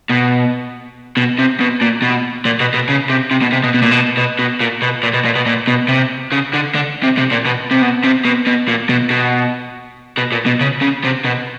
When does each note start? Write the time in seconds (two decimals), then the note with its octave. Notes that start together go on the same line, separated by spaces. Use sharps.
0.10 B2
1.17 B2
1.39 C3
1.61 B2
1.82 A#2
2.02 B2
2.45 A#2
2.60 B2
2.74 B2
2.89 C#3
3.10 C3
3.31 C3
3.42 B2
3.52 C3
3.64 B2
3.74 B2
3.82 A#2
3.91 B2
4.17 B2
4.39 B2
4.60 A#2
4.82 B2
5.03 A#2
5.14 B2
5.25 A#2
5.36 B2
5.46 A#2
5.67 B2
5.89 C3
6.32 C#3
6.53 D3
6.75 D3
7.03 C3
7.18 C3
7.31 A#2
7.46 B2
7.71 C3
7.82 B2
8.04 C3
8.25 B2
8.47 B2
8.68 A#2
8.89 B2
9.11 B2
10.17 B2
10.32 A#2
10.46 B2
10.61 C#3
10.82 C#3
11.04 C3
11.25 B2